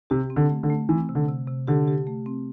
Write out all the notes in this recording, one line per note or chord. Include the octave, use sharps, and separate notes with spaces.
C3 G4
C4
D3
A3
D3
A3
E3 C4
C3
D3
C3
C3
D3 G4
G4
A3
C4